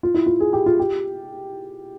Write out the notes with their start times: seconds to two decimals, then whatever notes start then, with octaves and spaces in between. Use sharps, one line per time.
0.03 F4
0.14 E4
0.26 F4
0.40 G#4
0.53 G4
0.66 F4
0.80 G4